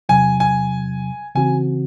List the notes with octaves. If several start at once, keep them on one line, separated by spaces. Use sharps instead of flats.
E2 C3 F#3 G#5
G#5
C#3 E3 C4 F#4 G#5